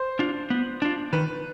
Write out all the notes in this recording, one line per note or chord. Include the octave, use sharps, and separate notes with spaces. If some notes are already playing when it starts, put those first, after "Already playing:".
Already playing: C5
D4 F4
B3
D4 F4
D#3 B4